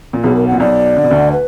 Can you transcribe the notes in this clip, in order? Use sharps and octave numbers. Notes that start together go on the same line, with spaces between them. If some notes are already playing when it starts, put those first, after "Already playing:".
A#2
B1 B2 G#4
A#4
A#2 F#5
B1 B2 D5
D3
B2
D2 D3
B4